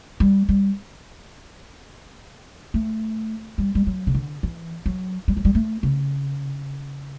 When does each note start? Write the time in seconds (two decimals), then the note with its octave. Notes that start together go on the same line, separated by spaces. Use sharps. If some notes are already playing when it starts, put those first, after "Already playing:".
0.20 G3
0.49 G3
2.74 A3
3.58 G3
3.75 G3
3.86 F#3
4.07 C#3
4.15 D3
4.43 E3
4.86 F#3
5.28 G3
5.37 F#3
5.45 G3
5.55 A3
5.83 C#3